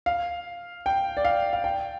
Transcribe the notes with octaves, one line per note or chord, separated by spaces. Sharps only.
F5
G5
D5
F5
F5
G5